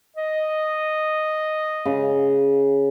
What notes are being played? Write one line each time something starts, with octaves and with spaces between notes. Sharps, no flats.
D#5
C#3